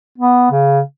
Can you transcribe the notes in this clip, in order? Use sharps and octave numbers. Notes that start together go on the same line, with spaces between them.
B3
C#3